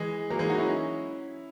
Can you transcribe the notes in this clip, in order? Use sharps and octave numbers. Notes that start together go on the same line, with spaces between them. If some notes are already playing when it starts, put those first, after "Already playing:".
Already playing: E3 G#3
F#3 A#3
E3 G#3
D#4 F#4
C#4 E4